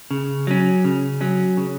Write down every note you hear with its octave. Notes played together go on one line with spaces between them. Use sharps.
C#3
F#3 C#4
C#3
F#3 C#4
C#3